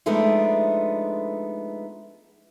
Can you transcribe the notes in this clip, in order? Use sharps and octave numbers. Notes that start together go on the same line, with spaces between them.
F3 G#3 A3 B3 D4 D#4